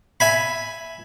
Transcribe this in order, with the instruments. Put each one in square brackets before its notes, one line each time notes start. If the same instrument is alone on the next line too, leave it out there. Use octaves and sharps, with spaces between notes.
[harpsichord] E5 G#5 B5